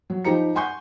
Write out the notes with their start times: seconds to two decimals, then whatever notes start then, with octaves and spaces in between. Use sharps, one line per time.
0.10 F#3
0.24 F3 D#4 G4 C5 A#5 C#7
0.55 F#5 G#5 C6 C#6 G6